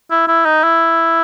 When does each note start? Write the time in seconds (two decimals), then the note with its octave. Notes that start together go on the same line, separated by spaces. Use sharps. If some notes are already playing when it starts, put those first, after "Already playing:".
0.10 E4
0.28 E4
0.45 D#4
0.63 E4